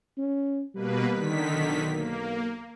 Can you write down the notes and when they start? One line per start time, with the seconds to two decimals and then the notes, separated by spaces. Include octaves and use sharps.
0.18 C#4
0.75 B2 G3 A#3 B4
1.12 D3 D#3 B6
1.53 B1
1.92 A#3